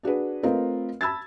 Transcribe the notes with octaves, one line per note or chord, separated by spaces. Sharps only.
D4 F#4 G#4 B4
A3 C4 F4 A#4 B4 D#5
A5 B5 E6 G#6 A6